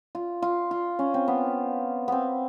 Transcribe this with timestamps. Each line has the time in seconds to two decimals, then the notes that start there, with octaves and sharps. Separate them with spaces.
0.15 F4
0.42 F4
0.71 F4
0.99 C#4
1.14 C4
1.28 B3
2.08 B3 C4